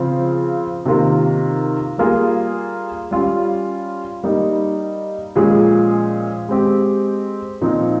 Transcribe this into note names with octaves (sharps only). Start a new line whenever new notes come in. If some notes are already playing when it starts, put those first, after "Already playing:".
Already playing: C#3 F3 C4 F4
C3 D#3 A#3 F4 A#4
G3 A#3 F4 G#4
G3 C#4 F4
G3 A#3 D#4
A#2 F3 G#3 C#4 G#4
G#3 C4 G4
A#2 F3 C4 D#4